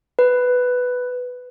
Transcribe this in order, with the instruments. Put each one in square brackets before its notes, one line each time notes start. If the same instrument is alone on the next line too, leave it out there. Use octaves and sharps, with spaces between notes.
[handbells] B4